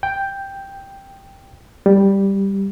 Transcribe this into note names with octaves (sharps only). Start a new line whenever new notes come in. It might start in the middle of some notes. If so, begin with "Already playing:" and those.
G5
G3